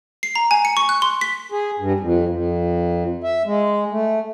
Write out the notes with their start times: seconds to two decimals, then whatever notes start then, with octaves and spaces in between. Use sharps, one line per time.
0.23 C7
0.36 A#5
0.51 G#5
0.65 C#7
0.77 C#6
0.89 F#6
1.02 C6
1.21 B6
1.52 G#4
1.79 G2
2.00 F2
2.29 F2
3.24 E5
3.46 G#3
3.91 A3